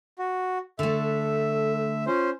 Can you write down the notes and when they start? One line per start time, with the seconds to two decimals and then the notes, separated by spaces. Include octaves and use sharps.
0.19 F#4
0.79 D3 A3 A4 E5
1.19 A4
2.06 C#4 F4 C5